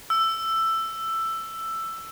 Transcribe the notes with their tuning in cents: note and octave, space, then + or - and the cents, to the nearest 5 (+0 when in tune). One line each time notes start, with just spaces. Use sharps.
E6 +10